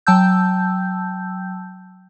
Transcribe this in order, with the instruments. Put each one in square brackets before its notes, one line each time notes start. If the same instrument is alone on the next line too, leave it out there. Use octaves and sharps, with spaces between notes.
[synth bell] F#3 G5 A5 E6 G6